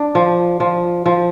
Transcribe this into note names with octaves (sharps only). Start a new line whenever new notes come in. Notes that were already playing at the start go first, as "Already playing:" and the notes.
Already playing: D4
F3
F3
F3